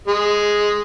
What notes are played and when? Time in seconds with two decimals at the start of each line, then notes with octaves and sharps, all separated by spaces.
0.08 G#3